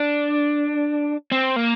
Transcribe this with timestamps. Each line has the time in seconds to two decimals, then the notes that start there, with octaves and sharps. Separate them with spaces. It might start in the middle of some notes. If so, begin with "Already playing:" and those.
Already playing: D4
1.31 C4
1.56 A#3